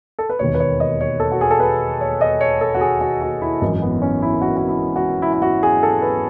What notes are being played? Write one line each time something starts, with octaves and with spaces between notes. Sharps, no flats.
A4
B4
E1 D#2 D#3 C#5
B4
C#5
D#5
C#5
A4
F#4
G#4
A4
B4
C#5
D#5
C#5
A4
F#4
G#4
F#4
F#4
E4
G#1 F#2 E3 D#4
B3
C#4
E4
F#4
F#4
E4
F#4
E4
E4
F#4
G#4
A4
B4